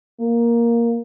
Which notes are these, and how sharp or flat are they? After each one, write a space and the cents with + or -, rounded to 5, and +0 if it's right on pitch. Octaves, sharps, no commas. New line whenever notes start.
A#3 +5